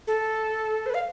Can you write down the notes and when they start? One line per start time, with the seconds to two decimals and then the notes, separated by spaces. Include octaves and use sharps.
0.07 A4
0.86 C5
0.90 B4
0.94 F5